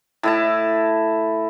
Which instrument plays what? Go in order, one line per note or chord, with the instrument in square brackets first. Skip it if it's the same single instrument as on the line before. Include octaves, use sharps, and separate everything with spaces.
[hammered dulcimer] A2 E4 A5